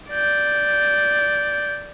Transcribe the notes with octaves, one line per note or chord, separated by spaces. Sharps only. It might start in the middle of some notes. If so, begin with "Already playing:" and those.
D5 G6